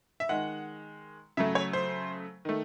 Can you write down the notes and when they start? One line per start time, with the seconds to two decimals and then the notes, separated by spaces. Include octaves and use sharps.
0.20 E5
0.29 D#3 G#3 F#5
1.37 C#3 F#3 A3 E5
1.55 C#5
1.73 C5
2.45 D#3 A3